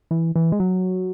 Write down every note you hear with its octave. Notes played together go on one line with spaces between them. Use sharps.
E3
E3
G#3
F#3